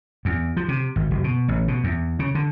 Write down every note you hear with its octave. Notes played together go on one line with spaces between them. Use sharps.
E2
F3
C3
G#1
F#1
B2
A1
B2
E2
C#3
D3